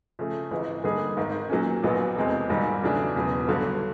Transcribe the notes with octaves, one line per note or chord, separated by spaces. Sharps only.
C#3 F3 A3
G#1 G#2 E3 G#3
D3 G3 A#3 D#4 G#4
G#1 G#2 D#3
A#2 F#3 A#3 C#4
A#1 A#2 F#3 B3 D#4
F1 E2 B2 G#3 C4
A#1 G#2 D#3 G3
E2 C#3 F#3 A3 D4
E1 E2 C#3 F#3 B3
G1 G2 D3 F#3